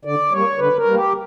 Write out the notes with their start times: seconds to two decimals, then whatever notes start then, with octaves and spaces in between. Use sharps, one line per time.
0.05 D3 D5
0.32 G3 A#3 C#5
0.59 D3 B4
0.77 A#4
0.85 G3 A#3
0.94 G4